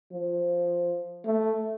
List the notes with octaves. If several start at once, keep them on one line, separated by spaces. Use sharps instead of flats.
F3
A3